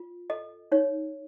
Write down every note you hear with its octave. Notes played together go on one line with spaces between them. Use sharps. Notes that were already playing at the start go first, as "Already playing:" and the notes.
Already playing: F4
A4 D#5
D#4 C#5